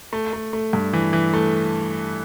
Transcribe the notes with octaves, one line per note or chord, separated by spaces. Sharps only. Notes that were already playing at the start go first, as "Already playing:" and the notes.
A3
A3
A3
G2
E3
E3
A3